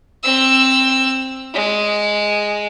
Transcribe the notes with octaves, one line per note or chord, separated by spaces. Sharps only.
C4 E6
G#3